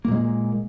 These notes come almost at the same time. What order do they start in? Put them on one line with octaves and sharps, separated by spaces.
A#3 A#2 G#3